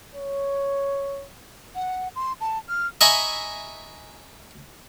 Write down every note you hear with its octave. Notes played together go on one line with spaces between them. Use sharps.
C#5
F#5
C6
A5
F6
D#5 E5 G#5 A#5 B5 C#6